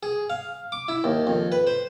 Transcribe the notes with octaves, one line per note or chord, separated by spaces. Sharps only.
G#4
F5
D6
E4
D#2
F2
B4
C5